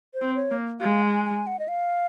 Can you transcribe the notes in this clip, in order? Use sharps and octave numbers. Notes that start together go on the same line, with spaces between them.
C5
C4
C#5
A#3
G#3 F5
G#5
G#5
F#5
D#5
F5